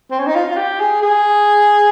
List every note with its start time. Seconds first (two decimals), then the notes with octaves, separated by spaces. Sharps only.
0.11 C4
0.19 C#4
0.27 D#4
0.35 F4
0.50 F4
0.57 G4
0.80 G#4
1.02 G#4